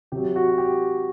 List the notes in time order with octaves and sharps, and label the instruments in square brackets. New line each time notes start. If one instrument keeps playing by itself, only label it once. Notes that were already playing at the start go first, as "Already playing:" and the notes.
[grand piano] C3 F#3 G4
F#4
G4